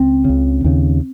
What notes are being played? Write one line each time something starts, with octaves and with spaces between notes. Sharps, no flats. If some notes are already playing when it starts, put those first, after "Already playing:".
Already playing: C#2 C4
C#2 C#3
D#2 C#3